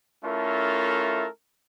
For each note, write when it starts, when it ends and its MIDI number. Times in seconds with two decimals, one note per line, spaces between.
0.24 1.27 57
0.24 1.27 61
0.24 1.27 64
0.24 1.27 65
0.24 1.27 69
0.24 1.27 70